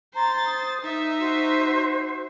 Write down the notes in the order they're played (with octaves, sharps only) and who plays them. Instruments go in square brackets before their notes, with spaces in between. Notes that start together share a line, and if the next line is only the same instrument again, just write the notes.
[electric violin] C5 A6 [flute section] A#5 C6
[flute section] D#6
[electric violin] D#4 E5
[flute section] F#4 C5